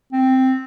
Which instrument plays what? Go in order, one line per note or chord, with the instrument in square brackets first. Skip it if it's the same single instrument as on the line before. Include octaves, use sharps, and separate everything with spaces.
[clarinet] C4